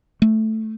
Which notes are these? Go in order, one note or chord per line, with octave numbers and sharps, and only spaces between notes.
A3